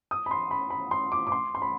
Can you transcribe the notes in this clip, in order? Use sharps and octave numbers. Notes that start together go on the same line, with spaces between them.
D#6
B5
C6
B5
B5
C6
D6
D6
C6
C6
B5